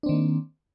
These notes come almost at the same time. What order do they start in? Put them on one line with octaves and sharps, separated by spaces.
D4 C4 D#3 A#3